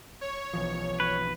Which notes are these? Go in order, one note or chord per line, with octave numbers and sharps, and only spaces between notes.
C#5
B1 E3 F3
B4